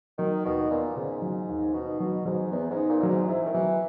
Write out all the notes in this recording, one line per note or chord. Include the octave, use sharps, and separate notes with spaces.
D#3 F#3
D#2 B2
A#2 B3
G#2 C#3
F#3
D#2
B2 D#4
B2 F#3
G#2 F#3
E2 B3
G#2
D#4
A#2
A#2 F#3
G#2
G#2 E4
D#3
E3 F#3